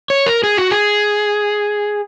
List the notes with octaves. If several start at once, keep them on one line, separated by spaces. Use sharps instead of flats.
C#5
A#4
G#4
F#4
G#4